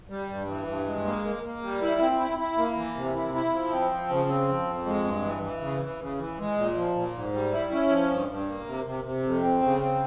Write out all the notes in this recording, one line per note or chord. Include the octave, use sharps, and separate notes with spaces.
G3
G2
E3
G2
G#3
A#3
A#3
A#3
G3
E4
C4
E4
E4
A#3
E3
C3
E4
E4
F3
C4
F3
C#3
C4
F3
F2
G#3
G2
E3
E3
C#3
E3
C#3
E3
G#3
A#2
F3
A#2
G#2
G3
E4
C#4
F3
G2
G2
A#3
C3
C3
C3
F2
C4
C#3
C4